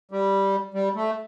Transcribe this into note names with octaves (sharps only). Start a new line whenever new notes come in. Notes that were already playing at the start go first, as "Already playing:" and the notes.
G3
G3
A3